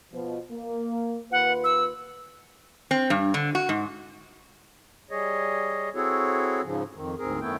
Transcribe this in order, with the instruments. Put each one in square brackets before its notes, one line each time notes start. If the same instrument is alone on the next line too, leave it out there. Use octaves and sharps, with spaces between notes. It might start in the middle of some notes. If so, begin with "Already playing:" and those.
[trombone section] B2 F3
A#3
[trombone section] D#2 F4 B4 [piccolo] F#5
[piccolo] E6
[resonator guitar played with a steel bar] C4
G2
D3
F#4
G#2
[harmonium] G3 G#4 C#5 D#5
C4 E4 F#4 G#4 A4 C#5
G#2 C#3 F3
F2 D#3
D2 G#2 C4 G#4 A#4
F#2 D#3 A3 B3 E4 G5